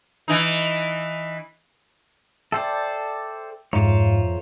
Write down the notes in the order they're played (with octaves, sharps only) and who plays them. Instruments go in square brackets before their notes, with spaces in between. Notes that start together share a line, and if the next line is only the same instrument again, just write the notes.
[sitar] E3 D#4
[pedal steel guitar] A4 C5 D5 [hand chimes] E5 G5 E6
[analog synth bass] F2 [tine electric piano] G#2 [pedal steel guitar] F4 C5 C#5 [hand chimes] E5 F5 A#5